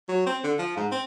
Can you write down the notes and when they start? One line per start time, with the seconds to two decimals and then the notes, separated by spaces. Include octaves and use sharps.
0.09 F#3
0.27 C4
0.44 D3
0.59 F3
0.77 G#2
0.92 C4